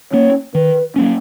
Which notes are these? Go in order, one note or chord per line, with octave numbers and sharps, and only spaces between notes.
A#3 C#4 C#5
D#3 B4
F#3 A#3 C#4